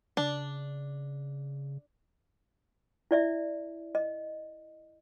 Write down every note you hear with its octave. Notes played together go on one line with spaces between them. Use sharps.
C#3 D4
E4 D5 E5
D#5